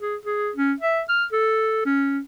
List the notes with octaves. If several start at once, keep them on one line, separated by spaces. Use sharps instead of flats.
G#4
G#4
C#4
E5
F6
A4
C#4